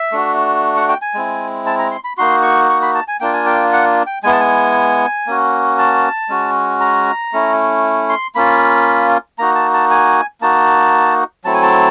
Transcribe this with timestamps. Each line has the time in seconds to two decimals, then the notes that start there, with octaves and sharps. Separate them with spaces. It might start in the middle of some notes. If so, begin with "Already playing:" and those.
Already playing: E5
0.12 A3 D4 F#4
0.76 F#5
0.89 G5
1.02 G#5
1.14 G#3 C4 E4
1.66 A5
1.79 A#5
1.91 C6
2.04 B5
2.18 A#3 D#4 F#4 C6
2.43 C#6
2.69 C#6
2.82 B5
2.95 A5
3.08 G#5
3.20 A#3 D4 F4 G5
3.33 G#5
3.46 G5
3.73 F#5
4.07 G5
4.23 G#3 B3 E4 G#5
4.32 A5
4.40 G#5
5.26 A#3 C#4 F#4
5.78 A5
6.29 G#3 C#4 F#4
6.80 A#5
7.33 A3 C#4 E4
8.09 C6
8.35 A#3 C#4 F4 B5
9.38 A#3 D#4 F#4 A#5
9.55 A5
9.73 A5
9.90 G#5
10.41 A#3 D#4 F#4 A5
11.44 F#3 A3 C4 E4 A5
11.54 G#5
11.62 A5